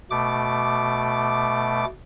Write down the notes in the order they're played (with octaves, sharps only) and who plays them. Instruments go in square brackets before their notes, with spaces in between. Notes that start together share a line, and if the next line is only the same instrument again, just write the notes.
[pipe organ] B2 A3 D6